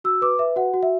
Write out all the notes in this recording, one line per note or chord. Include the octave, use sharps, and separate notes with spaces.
F#4 E6
B4 D6
B4 E5
F#4 F#5
F#4
E5